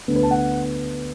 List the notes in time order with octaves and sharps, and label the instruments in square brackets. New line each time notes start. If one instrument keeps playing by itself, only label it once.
[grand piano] D2 D3 B3 D4
B4
A5
F#5